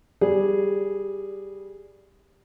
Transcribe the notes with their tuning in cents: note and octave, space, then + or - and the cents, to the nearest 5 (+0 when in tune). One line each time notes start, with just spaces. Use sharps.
G3 +0 G#4 -10 D5 -5